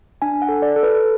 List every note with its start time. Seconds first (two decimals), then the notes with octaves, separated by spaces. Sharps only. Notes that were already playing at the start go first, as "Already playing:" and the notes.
0.22 D4 G#5
0.42 F#5
0.49 A4
0.62 D5
0.76 A4
0.83 B4